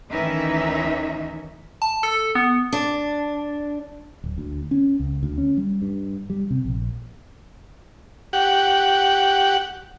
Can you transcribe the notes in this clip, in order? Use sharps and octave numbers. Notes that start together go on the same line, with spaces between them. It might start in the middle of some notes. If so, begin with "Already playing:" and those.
D2 D#3 E3 C#4 D#4 E5
A5
A4
B3
D4
D1
D2
C#4
C#2
D2
C#4
G3
G2
G3
C3
A#1
G4 F#5